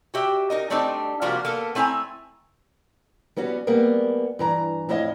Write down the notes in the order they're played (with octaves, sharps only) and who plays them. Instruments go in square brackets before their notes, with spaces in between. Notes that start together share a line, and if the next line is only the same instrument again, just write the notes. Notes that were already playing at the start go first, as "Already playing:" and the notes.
[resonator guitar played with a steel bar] F#4 G4 E5
D#4 A#4 D#5
G3 A3 C4 D4 D#4
C3 F3 G3 A#3 F4 F#4
A#3 B3 A4
A3 C4 E4 G#5 A#5
[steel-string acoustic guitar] G3 B3 C#4 F#4
G3 A#3 B3 G#4
G2 E3 A#5
F2 A2 E4 C#5 D#5 F5